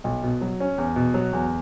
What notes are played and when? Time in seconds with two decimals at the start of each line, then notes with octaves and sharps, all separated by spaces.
0.04 B1
0.23 B2
0.41 F#3
0.60 C#4
0.78 E2
0.96 B2
1.14 F#3
1.33 E2